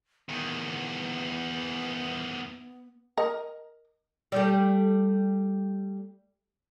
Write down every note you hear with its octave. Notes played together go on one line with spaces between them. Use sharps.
E2 D#3 B3
A#4 D#5
G3 A3